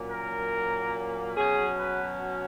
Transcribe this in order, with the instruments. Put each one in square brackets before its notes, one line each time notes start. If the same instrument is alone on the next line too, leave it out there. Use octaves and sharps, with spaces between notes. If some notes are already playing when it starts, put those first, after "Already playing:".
Already playing: [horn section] A#2 F#3 A#3 C#4
A#4
B2 F#3 C#4 G#4
B4